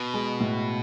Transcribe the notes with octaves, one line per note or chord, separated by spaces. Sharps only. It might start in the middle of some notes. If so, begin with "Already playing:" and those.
Already playing: B2
G#3
A2